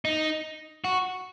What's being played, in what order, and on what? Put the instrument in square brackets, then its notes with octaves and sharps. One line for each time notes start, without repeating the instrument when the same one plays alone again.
[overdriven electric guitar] D#4
F#4